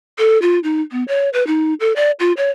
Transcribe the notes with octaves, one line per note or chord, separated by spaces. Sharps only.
A4
F4
D#4
B3
C#5
B4
D#4
A4
D5
F4
C#5